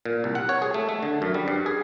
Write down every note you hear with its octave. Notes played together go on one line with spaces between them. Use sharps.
A#2
C2
F#5
C#5
G#4
A3
A3
D3
F#2
G3
G2
G#4